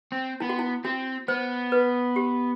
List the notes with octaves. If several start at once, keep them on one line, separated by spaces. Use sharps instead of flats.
C4
B3 E4
F#4
E4
C4 F#4
B3 C5
B4
G4